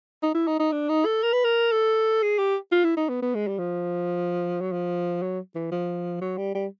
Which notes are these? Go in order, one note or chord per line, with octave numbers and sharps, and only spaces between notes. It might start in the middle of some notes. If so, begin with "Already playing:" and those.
D#4
E4
D#4
D#4
D4
D#4
A4
A#4
B4
A#4
A4
G#4
G4
F4
E4
D#4
B3
B3
G#3
G3
F3
F#3
F3
F#3
E3
F3
F#3
G3
G3